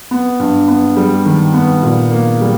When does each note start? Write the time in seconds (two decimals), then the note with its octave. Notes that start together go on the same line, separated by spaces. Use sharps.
0.11 B3
0.40 G2
0.68 B3
0.96 G3
1.25 D#3
1.54 B3
1.83 A#2
2.11 A#3
2.41 G3